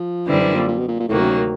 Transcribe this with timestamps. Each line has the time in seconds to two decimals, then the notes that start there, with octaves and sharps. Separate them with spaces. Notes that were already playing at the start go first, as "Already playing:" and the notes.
Already playing: F3
0.27 F#2 D3 E3 G3 C4 E4
0.40 E3
0.55 A#2
0.68 A#2
0.78 B2
0.88 A#2
0.99 A#2
1.09 D2 A2 C3 D#3 F#3 A#3
1.19 F#2
1.30 F#2